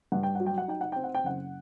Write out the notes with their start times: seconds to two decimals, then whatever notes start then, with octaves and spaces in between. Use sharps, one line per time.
0.12 G2 F#5
0.23 G5
0.35 F#3 F#5
0.46 G5
0.58 F#5
0.68 D#4 G5
0.81 F#5
0.92 C4 G5
1.04 F#5
1.15 G5
1.24 F#1 F#5